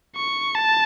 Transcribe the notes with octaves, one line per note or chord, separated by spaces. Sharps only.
C#6
A5